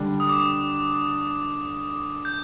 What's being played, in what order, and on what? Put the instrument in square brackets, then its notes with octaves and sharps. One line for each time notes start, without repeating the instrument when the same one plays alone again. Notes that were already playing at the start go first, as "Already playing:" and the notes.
Already playing: [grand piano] D3 G3 D4
[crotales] D#6
D6
D#6
G6